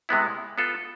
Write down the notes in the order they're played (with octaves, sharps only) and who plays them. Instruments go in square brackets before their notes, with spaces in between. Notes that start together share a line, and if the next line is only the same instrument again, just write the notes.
[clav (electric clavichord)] C3 G#3 B3 E4
B3 F4 A4